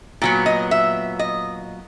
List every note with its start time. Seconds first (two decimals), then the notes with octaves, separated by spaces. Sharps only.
0.22 A#2 F#3 B3
0.46 D#5
0.71 E5
1.19 D#5